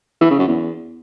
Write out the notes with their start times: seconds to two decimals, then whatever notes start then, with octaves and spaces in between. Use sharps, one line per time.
0.21 E3
0.30 C#3
0.39 F#2
0.48 E2